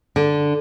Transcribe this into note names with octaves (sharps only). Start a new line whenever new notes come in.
D3